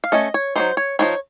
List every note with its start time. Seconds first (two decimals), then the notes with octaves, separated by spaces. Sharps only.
0.04 F5
0.12 A3 C#4 D#5
0.34 C#5
0.56 F#3 A#3 D#4 C5
0.77 C#5
0.99 F3 C4 D#4 C#5